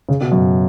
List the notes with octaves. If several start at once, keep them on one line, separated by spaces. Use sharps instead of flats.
C#3
B2
F#2